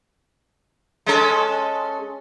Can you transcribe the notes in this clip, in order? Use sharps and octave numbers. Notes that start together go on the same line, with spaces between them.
G#3 C#4 A4